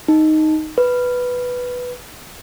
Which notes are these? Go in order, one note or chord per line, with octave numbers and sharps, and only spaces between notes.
D#4
B4